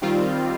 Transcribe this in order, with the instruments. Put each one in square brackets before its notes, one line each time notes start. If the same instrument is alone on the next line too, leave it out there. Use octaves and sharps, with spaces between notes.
[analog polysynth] D#3 G3 C4 F4